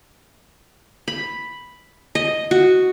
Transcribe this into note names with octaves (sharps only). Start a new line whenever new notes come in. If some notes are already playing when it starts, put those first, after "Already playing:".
B5
D#5
F#4